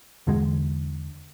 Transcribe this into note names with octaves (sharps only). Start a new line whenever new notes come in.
E2 D3 G#3